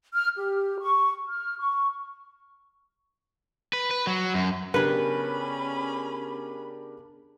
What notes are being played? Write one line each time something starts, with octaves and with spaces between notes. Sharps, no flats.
F6
G4
C#6
F6
C#6
B4
B4
F#3
F#2
C#3 B3 C#4 D4 G4 A#4 B4 B5